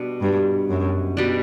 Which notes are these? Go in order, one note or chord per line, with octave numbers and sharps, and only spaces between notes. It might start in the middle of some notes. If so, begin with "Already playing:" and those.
Already playing: B2 G3 D4
G2
F#2
B2 G3 D4